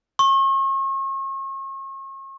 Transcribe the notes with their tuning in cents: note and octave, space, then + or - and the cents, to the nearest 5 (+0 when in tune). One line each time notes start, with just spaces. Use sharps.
C#6 -40